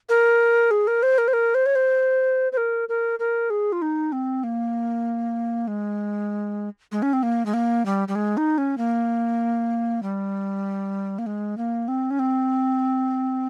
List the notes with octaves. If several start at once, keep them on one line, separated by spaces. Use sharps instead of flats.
A#4
G#4
A#4
C5
A#4
C5
A#4
C5
C#5
C5
C5
A#4
A#4
A#4
G#4
F4
D#4
C4
A#3
G#3
G#3
C#4
C4
A#3
G#3
A#3
G3
G3
G#3
D#4
C#4
A#3
G3
A#3
G#3
A#3
C4
C#4
C4